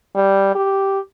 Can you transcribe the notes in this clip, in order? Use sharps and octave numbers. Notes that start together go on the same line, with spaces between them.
G3
G4